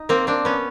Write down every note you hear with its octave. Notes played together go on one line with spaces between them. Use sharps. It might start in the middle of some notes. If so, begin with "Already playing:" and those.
Already playing: D#4
A#3 C4
C4 D4
B3 C#4